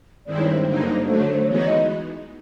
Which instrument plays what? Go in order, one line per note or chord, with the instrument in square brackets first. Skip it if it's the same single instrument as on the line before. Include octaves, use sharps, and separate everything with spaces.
[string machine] G2 D#3 G#3 C4 E4 [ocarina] D5
[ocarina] C#5
C5
[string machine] G2 D3 F#3 A#3 D#4
[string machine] D3 F#3 A3 [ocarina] C5
[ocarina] C#5
C5
[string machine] E3 G#3 B3 D#4 F#4 [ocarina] C#5
[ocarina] D#5